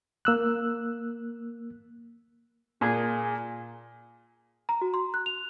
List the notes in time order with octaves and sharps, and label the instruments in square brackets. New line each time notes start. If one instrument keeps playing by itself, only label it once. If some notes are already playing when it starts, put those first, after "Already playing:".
[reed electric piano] A#3 E6 F#6
[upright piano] A#2 [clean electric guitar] G#4
[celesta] A#5
F#4
C6
F#6
F7